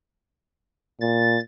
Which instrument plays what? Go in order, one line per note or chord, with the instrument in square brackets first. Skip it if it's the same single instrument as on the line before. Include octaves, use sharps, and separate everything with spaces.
[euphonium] A#2 [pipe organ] A6